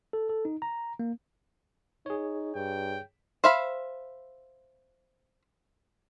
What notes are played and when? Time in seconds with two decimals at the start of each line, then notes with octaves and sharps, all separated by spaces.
0.13 A4
0.29 A4
0.45 D#4
0.62 A#5
0.99 A#3
2.06 D#4 G#4 C#5
2.56 G2 G5
3.44 C5 E5 F5 B5